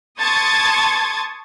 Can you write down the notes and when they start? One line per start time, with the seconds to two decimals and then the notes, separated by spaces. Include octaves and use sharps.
0.19 A5 C6 C#6 D#6 G#6 A6